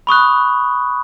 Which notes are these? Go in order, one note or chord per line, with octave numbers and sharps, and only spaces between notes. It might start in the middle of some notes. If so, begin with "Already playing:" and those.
B5 C#6 D#6 F#6